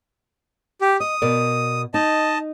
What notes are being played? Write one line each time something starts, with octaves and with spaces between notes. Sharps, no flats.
G4
D#5 D#6
B2 A#4 D5
D#4 D#5 A5